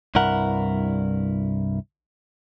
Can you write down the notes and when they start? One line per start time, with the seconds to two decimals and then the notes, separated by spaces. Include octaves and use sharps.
0.15 C2 G2 E4 A#4 F#5